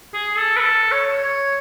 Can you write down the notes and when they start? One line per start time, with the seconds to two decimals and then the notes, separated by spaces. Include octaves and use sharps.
0.14 G#4
0.37 A4
0.57 B4
0.60 A4
0.92 C#5
1.24 C#5